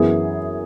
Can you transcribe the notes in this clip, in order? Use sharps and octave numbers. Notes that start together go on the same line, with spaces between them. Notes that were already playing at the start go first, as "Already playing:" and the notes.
Already playing: F#2 E3 B3 E4 G#4